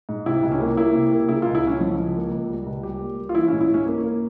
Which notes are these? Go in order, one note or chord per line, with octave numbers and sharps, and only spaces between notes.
G#2
C3 E4
C#2
C#4
A#3
A#3 E4
C3
A#3
C#3 E4
F4
C#2
E4
C#2 C#4
F3
C#2
A#3
C#2
G3
C#2
G3 G4
A#3
A#3
F4
E3 E4
G#2 C#4
E4
G#2 C#4
A#3
A#3